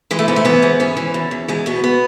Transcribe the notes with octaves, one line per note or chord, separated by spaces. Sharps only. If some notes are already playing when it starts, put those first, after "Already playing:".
E3 G#3
A3
G#2 B3
A3
E3 B3
G#2
E3 C#4
E3
E2
E2
E2 G#3
B2 B3
B3